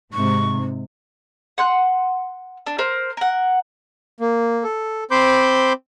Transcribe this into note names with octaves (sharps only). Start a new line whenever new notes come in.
G#2 C3 C#6
F#5 C6 F#6
D4
A#4 C5
A#4 F#5
A#3
A4
C4 C5 B5 C6 D6 G6